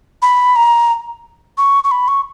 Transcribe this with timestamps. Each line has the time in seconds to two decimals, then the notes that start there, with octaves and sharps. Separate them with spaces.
0.22 B5
0.56 A#5
1.58 C#6
1.84 C#6
1.91 B5
2.08 C#6